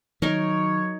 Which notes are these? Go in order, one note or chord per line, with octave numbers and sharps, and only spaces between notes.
D#3 F#3 D#4 A#4 C#5